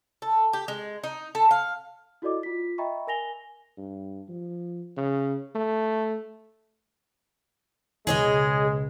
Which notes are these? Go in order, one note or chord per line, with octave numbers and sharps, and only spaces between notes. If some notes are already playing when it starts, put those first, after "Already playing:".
A4
G4
G#3
D#4
A4
F5
E4 F#4 A4 D5 D#5 D6
F4 B6
D#5 E5 G5 A#5 B5 C#6
A#4 G#5 A#6 F7 G7
G2
F3
C#3
A3
C#2 B2 G#3 G#4 C#5 D#5